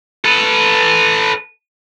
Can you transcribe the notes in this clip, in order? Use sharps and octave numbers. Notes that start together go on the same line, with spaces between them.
A4 B4